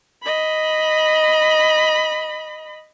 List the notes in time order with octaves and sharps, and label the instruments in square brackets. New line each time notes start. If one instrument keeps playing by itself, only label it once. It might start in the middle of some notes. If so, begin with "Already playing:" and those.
[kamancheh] D#5 B5